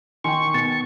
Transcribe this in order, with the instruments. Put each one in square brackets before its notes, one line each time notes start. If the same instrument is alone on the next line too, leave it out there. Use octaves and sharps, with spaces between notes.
[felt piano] D#3 G5 [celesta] G#5 C6 [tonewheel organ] C#6
[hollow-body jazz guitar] B2 [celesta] A6 C#7